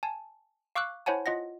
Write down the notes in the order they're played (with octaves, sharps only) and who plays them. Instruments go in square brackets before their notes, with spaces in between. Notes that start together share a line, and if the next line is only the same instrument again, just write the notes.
[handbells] G#5 A5
F5 C#6 D6 E6 F#6
E4 C5 C#5 F#5 G#5 A5
F4 D#5 F#5 A#6